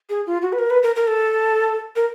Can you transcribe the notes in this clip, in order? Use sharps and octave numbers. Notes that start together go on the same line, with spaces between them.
G#4
F4
F#4
B4
A#4
B4
A#4
A#4
A4
A#4